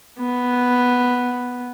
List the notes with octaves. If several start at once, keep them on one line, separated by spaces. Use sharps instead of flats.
B3